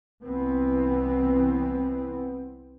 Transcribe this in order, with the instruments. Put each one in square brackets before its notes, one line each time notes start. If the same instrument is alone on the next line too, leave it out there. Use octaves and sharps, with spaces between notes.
[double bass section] C2 E3 B3 C4